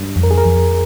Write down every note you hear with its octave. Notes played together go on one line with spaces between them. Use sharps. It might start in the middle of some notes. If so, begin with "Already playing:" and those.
Already playing: G2
F2
A#4
G#4
A#4
F2